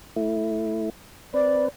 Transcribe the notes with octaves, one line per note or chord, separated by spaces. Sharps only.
A3 E4
C4 B4 D5